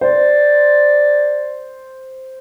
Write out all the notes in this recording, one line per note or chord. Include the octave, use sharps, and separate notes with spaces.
C5 D5